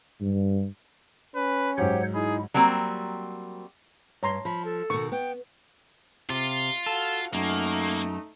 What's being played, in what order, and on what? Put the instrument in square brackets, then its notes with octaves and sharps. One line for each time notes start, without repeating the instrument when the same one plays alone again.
[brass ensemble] G2
[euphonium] C#4 [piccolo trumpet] B4
[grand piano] G#2 F#3 [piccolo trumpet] G4 [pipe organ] C5 C#5 F#5
[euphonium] D#4 [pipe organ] E4 [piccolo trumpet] G#4
[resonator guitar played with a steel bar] F#3 G3 A#3 C4
[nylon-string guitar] G2 [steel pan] C#5 A#5 C6
[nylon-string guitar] F3 [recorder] B5
[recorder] A4
[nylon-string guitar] B2 D#3 [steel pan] C#6
[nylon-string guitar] B3 [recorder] G5
[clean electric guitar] C3 [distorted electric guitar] F4
[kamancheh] F#4 F5 [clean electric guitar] A4
[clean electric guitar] F#2 [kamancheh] A3 D#4 [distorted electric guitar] A#3